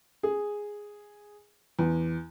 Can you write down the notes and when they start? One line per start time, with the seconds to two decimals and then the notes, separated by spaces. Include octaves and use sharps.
0.23 G#4
1.79 E2